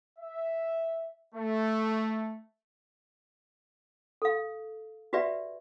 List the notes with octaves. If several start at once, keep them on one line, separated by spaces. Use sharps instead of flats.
E5
A3
A4 F5
F#4 G4 B4 D5 E5